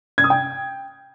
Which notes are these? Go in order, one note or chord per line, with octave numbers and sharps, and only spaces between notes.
G#6
D#6
G5